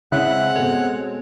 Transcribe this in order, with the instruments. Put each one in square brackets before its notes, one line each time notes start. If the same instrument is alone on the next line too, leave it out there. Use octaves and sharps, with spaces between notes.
[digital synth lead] C#3 [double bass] G#3 C4 [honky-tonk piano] C#4 E4 E5 [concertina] F#5 F#6
[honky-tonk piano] B2 A4 [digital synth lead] C#5